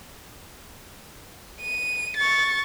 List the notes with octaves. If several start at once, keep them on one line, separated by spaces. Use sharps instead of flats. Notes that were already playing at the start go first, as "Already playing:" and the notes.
D#7
C#6 A6